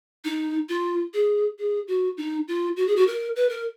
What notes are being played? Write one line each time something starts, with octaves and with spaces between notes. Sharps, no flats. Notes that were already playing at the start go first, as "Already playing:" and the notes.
D#4
F4
G#4
G#4
F#4
D#4
F4
F#4
G#4
F#4
A#4
B4
A#4